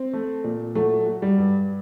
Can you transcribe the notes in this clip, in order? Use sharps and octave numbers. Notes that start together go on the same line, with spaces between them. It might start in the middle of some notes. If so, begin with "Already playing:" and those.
Already playing: C4
A3
A#2
F#3 A3
F#4
G3
G2